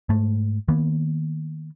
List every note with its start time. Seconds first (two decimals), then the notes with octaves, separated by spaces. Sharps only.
0.09 G#2 A3
0.68 D#3 A#3 B3